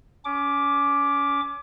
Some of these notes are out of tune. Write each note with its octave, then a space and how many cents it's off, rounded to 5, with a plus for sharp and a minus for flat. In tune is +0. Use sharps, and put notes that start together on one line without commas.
C#4 +25 D6 +0